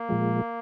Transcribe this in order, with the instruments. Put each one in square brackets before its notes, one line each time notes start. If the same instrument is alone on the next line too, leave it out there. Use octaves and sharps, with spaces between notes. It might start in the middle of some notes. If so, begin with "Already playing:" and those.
Already playing: [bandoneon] A#3
[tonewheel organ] A#2 F3 G#3